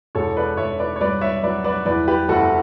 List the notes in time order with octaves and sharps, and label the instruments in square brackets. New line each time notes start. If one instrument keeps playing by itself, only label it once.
[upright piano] E1 A4 C#5
B4 D5
E1 C#5 E5
B4 D5
C#5
G2 B4 D5
C#5 E5
F#3 B4 D5
B4 D5
E2 B4 D5
G4 B4
F#1 F#4 A4